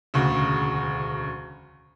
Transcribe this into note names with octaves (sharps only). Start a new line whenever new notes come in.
E1 D2 C#3